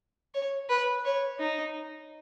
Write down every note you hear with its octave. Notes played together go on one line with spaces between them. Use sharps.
C#5
B4
C#5
D#4